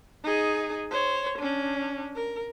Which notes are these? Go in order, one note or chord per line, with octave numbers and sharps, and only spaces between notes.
D#4 G#4
C5 C#5
C#4 D4
A#4